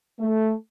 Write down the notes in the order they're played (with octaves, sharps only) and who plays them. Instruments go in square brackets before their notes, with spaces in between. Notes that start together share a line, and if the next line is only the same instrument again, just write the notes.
[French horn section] A3